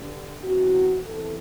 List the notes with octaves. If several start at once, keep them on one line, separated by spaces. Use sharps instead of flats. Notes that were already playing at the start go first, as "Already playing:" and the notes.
Already playing: G2 D3
E2 C3 E3 F#4
E2 C3 E3 A4